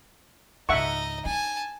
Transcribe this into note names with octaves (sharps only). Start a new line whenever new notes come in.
C#2 G#2 D#4 D#5 E5 F#5 C#6
D#4 G#5 A5